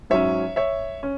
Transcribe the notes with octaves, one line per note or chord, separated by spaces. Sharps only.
G#2 F#3 C#4 C#5 E5
C#5 E5
C#4